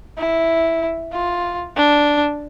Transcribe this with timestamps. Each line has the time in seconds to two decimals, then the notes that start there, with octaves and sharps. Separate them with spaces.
0.18 E4
1.13 F4
1.76 D4